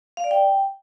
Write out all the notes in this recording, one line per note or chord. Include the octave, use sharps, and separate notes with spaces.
F5
D5
G5